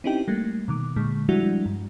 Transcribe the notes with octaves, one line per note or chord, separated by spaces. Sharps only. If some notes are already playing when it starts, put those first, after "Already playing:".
C4 C#4 D#4 E4 G4 G5
G3 A3 A#3
B2 D#3 D6
A#2 D3 G#3
F3 G3 G#3 D4 E4 F#4
G2